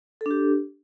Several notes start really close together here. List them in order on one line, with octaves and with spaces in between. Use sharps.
A4 D4 G4